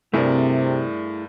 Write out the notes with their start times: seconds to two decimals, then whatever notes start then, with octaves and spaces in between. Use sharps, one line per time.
0.14 G2 C3 A3 E4 G#4 A#4 D5